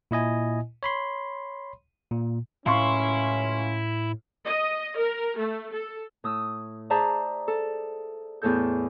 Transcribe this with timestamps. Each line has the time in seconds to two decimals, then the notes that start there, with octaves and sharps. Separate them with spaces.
0.11 A#2 E4 D#5 G#5
0.83 C#5 B5 C6
2.11 A#2
2.66 C#2 F#2 A2 C#4 E4 F5 C6 C#6
4.44 D#5
4.96 A#4
5.36 A3
5.72 A4
6.24 A2 D#6 E6
6.90 G#4 C5 D5 E5 A5 A#5
7.48 A4
8.42 E2 A2 A4 G6